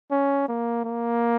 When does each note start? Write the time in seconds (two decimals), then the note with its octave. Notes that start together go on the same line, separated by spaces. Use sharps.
0.11 C#4
0.48 A#3
0.85 A#3